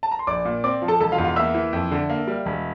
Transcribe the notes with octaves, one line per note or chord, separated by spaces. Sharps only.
A5
A#5
C6
A#1 D5 D6
A#2
C4 D5 D6
F3
A4 A5
E1 A4 A5
F4 F5
E2
F4 F5
A#3 E5 E6
E3
F2
D3
A#3
G3
E1